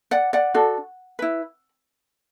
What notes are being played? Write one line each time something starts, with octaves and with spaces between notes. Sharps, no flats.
D5 F#5
D5 F#5
D4 F#4 A4
E4 B4